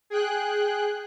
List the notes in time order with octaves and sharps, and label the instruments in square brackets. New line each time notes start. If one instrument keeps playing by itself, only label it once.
[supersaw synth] G#4 G5 F#6